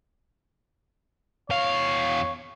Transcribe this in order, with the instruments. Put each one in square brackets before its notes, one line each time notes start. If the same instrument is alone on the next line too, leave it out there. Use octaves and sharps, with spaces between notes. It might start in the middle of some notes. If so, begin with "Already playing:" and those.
[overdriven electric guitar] E2 F5 [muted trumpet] C#5